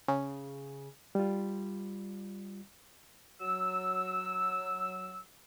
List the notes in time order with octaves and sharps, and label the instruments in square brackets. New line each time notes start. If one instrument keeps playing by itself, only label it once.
[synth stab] C#3
[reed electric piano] G3 F4
[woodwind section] F#3 E6